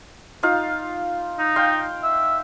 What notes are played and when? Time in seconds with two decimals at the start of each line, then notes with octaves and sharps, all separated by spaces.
0.43 D#4 F4 F5
1.39 D#4
1.56 F5 G5 C6
2.03 E5